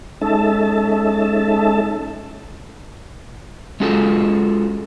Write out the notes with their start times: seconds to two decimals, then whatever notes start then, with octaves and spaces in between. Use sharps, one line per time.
0.21 G#3 C#4 D#4 A4 E5 A5
3.80 G#3 C#4 F4 F#4 G#4 A4